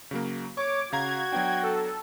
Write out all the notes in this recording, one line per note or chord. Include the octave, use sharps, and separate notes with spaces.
C#3 F#3 A#3
C#5 C#6 D6
C#3 F#4 F5 A#5 G#6
F#3 B3 D4 G5
A4